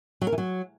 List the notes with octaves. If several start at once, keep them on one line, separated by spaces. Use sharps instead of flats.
F#3
A#4
E3
F#3